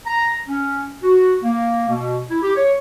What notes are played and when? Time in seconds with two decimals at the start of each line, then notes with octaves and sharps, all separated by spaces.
0.06 A#5
0.48 C#4
1.03 F#4
1.43 A#3
1.89 B2
2.30 E4
2.42 G4
2.56 C#5